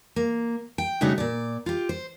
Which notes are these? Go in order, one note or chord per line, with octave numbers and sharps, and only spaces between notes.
A#3
G5
C#3 G3 A3 D4 D#4 F#4
A#2 D5
F4 G4
C5